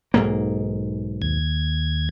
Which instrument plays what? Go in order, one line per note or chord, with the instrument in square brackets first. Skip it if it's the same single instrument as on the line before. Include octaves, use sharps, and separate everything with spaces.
[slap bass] B1 G#2 A#3
[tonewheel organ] D#2 G#6